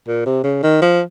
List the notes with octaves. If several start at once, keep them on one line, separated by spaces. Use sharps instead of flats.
A#2
C3
C#3
D#3
F3